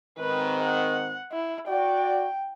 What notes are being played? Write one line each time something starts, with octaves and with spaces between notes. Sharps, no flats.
G#2 D#3 C4 B4
F#5
E4
F#4 D5 G5